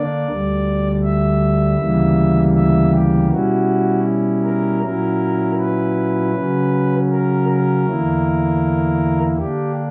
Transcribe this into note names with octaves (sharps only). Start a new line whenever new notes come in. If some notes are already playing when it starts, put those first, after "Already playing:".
Already playing: D3 A#3 D4 D5
D2 D3 G3
E5
D2 C#3 E3 G3 A#3
E5
G4
B2 G3 C#4 E4 F#4
A#4
A#2 F#3 C#4 E4 A#4
B4
C#3 F#3 C#4
A#4
A#4
E2 D3 A#3 E4
D3 A#3 D4 G4